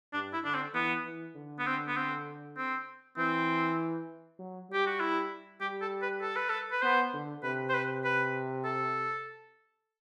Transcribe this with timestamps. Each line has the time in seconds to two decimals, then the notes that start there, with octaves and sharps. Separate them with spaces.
0.13 G2 D4
0.33 E4
0.44 D3 D4
0.55 C4
0.74 E3 B3
1.05 E3
1.35 D3
1.59 B3
1.66 C4
1.87 B3
1.96 C4
2.57 C4
3.17 E3 C4
4.39 F#3
4.70 G3 G4
4.86 F#4
5.00 E4
5.61 G3 G4
5.81 A4
6.02 B4
6.21 A4
6.36 B4
6.49 A4
6.71 B4
6.82 B3 C5
7.13 D3
7.43 C3 B4
7.69 C5
7.74 B4
8.05 B4
8.65 A4